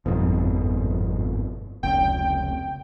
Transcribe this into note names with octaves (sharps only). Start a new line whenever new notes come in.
G1 F2 G#2 B2
F1 C#2 G5